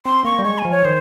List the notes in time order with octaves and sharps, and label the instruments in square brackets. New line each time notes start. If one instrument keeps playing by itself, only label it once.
[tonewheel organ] C4 [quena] C6
[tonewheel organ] A#3 [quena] C#6
[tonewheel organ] G3
[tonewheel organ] G#3 [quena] C#6
[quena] G#5
[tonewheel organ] F3
[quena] C#5
[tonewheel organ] D#3 [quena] C5